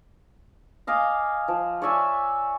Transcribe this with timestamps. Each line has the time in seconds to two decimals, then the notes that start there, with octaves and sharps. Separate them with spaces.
0.87 D#5 F5 G#5 D6
1.48 F3
1.82 C#5 D5 E5 G#5